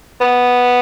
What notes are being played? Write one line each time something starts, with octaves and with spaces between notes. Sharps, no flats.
B3